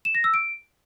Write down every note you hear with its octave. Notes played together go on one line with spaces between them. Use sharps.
E7
A#6
E6
D7